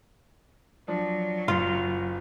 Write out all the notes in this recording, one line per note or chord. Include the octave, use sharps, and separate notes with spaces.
F3 F#3 D4
F#1 F4